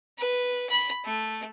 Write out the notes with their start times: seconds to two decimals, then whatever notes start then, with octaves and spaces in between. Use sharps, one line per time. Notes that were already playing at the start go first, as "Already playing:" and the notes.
0.18 B4
0.69 B5
1.05 A3